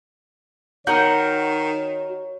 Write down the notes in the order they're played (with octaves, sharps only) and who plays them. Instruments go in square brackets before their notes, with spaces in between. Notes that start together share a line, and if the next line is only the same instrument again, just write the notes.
[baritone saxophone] D#3 [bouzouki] F#4 A#4 D#5 [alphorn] C#5 [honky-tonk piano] G6